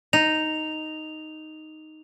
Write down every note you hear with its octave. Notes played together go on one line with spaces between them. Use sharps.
D#4 F7